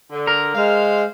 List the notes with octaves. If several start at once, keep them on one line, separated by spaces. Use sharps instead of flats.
D3
A#4
G#3 C5 F5